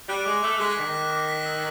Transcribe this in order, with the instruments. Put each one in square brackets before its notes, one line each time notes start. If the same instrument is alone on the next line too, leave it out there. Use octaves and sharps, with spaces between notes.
[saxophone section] G3 [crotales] F#6
[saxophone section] G#3 [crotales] D6
[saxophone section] A3 [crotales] D6
[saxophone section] G#3 [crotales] B6
[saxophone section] D#3 [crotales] B6
[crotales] F#6
D6
B6
E6